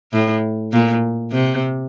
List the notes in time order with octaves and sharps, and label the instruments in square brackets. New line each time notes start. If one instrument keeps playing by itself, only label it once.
[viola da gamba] A2
A#2
C3